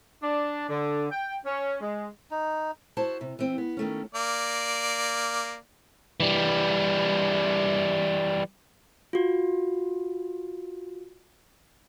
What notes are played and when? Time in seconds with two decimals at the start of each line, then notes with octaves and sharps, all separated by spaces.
0.22 D4
0.70 D3
1.11 G5
1.45 C#4
1.81 G#3
2.31 D#4
2.97 E4 F#4 C5 A5
3.21 C3
3.39 E3 C4
3.58 B3
3.77 D#3 A3 C#4
4.15 A#3 D5
6.20 E3 G3
9.13 F4 F#4